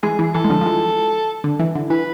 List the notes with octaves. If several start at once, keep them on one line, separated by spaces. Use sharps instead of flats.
E3 G#3 G#4
E3
G#4
E3 A4
G#3
D3 F3
F3
E3 G#3
D3
E3
D3
E3 B4